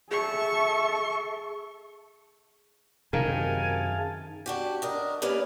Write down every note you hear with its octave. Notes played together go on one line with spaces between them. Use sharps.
G#4 A4 E5 C#6
F#2 C3 D#3 G#4 F5 G#5 A5
D4 F#4 G4
D4 A#4 D#5
G3 A#3 C#4 B4 D5 F5